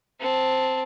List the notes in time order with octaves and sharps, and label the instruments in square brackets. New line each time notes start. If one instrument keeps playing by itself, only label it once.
[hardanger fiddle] C4 A5